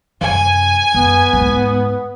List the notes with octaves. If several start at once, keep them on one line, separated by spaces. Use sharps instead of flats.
F#2 C3 G#5
F#2 B3
D2 G#2